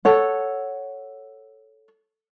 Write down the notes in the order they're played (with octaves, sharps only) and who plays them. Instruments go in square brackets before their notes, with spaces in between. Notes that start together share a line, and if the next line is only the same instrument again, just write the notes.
[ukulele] A4 C#5 F#5